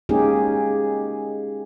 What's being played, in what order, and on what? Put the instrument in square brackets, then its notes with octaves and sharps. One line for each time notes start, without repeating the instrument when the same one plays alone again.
[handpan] G#3 A#3 C#4 D#4 G4 G#4